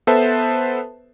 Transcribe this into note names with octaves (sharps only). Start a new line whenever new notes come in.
B3 A4 B4 C5 E5 A5